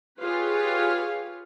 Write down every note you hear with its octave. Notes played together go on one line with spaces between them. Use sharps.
F4 G4 G#4 B4 C#5 F5